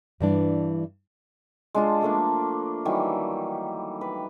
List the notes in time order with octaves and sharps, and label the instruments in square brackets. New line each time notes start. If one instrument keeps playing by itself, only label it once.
[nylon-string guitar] G2 E3 D4
[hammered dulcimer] G#3 D4 F4
F3 A3 A#3 D4
D#3 E3 F#3 G3
B4